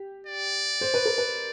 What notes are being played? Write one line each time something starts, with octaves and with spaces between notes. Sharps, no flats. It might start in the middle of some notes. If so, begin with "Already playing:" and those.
Already playing: G4
D5
C5
B4
A#4
B4